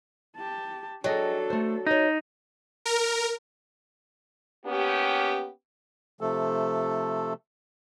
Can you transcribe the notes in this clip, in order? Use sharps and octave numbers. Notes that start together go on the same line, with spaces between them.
G4 A5
F#3 D4 G#4 A4 D#5 G5
A3 C5
D#4 C#5 D#5
A#4
A#3 B3 C#4 G4
C3 F3 A3 A4